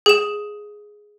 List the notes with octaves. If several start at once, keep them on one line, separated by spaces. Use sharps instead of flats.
G#4 E7